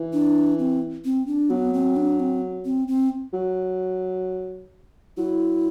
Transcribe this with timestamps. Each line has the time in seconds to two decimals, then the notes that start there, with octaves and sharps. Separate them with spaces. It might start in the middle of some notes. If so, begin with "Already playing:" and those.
Already playing: E3
0.13 D4
0.59 C4
1.05 C4
1.27 D4
1.50 F#3 B3
1.74 C4
1.96 D4
2.20 C4
2.65 C4
2.88 C4
3.34 F#3
5.17 F#3 E4